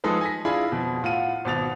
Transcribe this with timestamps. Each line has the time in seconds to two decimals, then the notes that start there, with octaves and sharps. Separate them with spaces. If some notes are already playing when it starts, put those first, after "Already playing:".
0.04 F3 G#3 D#4 G#4 A4 B4
0.21 G#5 A#6 B6
0.45 D4 E4 F4 G#4 G#5 B5
0.72 F2 B2
1.03 A2 F4 F#5 D#7
1.45 G#1 B2 A6 F7